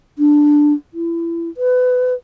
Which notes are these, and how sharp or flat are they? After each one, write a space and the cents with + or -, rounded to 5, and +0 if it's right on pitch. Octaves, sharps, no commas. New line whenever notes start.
D4 +5
E4 +30
B4 +25